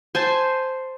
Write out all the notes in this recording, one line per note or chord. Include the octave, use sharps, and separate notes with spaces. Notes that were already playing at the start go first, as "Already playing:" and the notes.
C5 G#5 A5